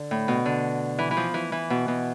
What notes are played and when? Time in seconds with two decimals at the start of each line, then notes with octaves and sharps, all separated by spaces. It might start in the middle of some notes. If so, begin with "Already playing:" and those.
Already playing: D3
0.11 A2
0.28 B2
0.46 D3
0.98 E3
1.11 E3
1.17 F3
1.34 E3
1.52 E3
1.70 B2
1.88 B2